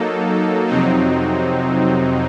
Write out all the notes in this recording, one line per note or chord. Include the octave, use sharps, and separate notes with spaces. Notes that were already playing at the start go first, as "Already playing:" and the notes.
Already playing: F#3 A#3 D#4 A4
F2 C3 F#3 C4 D#4